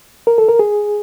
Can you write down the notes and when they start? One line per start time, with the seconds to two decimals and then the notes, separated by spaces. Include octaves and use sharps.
0.27 A#4
0.38 A4
0.49 A#4
0.59 G#4